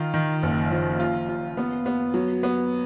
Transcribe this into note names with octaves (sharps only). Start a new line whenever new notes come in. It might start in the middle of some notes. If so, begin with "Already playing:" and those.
Already playing: D#3 F4
D#3
F#1
F3
F4
F4
B3
B3
F#3
B3